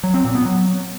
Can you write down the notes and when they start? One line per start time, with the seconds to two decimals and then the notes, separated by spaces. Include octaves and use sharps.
0.04 F#3
0.14 C4
0.24 A#2
0.35 B3
0.45 F#3